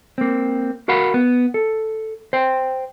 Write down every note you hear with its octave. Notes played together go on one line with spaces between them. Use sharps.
A#3 C4
F#4 A#4 F5 F#5 B5
B3
A4
C5 G5